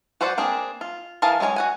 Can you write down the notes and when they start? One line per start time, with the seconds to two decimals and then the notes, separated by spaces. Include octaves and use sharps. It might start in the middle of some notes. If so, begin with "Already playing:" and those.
0.21 F#4 B4 C5 D5 F#5
0.38 A#3 C4 D4 G#4
0.81 F4
1.22 E3 G#4 A#4 F5 A5
1.40 G#3 C#4 G#4 C#5 G#5
1.56 F#4 F#5 G#5